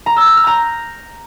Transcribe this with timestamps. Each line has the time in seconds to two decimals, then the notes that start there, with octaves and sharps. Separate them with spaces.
0.06 A#5
0.16 E6
0.27 G6
0.37 F6
0.47 A#5